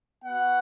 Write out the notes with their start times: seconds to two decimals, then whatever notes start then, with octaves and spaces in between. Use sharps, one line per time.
0.24 B3 F#4 F#5